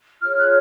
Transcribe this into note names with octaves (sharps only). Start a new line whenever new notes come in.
F4 G#4 C#5 F6
F#6